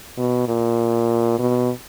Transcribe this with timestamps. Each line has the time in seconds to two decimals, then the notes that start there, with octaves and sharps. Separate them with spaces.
0.18 B2
0.48 A#2
1.39 B2